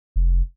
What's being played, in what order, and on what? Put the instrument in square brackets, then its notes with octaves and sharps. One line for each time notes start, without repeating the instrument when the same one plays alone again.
[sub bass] F1